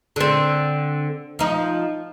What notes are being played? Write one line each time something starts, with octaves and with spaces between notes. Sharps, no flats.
D3 C4
F3 D#4